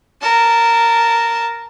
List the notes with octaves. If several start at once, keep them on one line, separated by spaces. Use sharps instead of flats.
A#4 A5